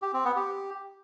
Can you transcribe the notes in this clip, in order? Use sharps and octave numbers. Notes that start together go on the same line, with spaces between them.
G4
C4
B3
G4